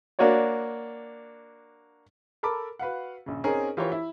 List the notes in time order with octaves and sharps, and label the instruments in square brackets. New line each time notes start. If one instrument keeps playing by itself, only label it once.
[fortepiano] A#3 D4 F#4 C#5 D5
[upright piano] A4 A#4 A5 B5 D6
F#4 B4 F5 F#5
A#1 C#3
C4 C#4 D#4 G#4 A#4 C#5
E3 F4 G4 A#4 C5 C#5
E4